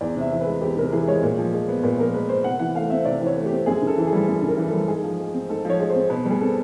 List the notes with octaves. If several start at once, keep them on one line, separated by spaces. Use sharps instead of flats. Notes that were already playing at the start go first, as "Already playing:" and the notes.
E2 D5
C3
E5
E3
B4
G#3
E2 G4
C3 A#4
E3 G#4
G#3 C#5
A#2
F3
G#3
B3
A#2 B4
F3 A#4
G#3 B4
B3 C5
C3 F#5
E3 F#5
A3 F5
C4 E5
C3 D5
E3 C#5
A3
G4
C4
F#2 G#4
C#3
A4
E3
G#4
G3
F#2 A4
C#3
A#4
E3
G3 A4
G#2 G#4
F3
G#3
C4
G#2 A4
F3 C#5
G#3
C5
C4
B2 B4
G3
G#4
C4 A4